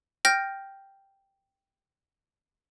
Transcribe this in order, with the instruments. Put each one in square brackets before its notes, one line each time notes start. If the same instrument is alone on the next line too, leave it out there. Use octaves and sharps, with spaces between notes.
[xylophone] G5 F6 G6 A#6